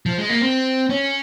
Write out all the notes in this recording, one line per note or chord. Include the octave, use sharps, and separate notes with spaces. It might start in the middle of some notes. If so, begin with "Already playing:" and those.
F3
G#3
A#3
C4
C#4